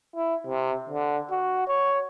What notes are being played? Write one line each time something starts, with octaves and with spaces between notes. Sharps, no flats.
E4
C3
D3
F#4
C#5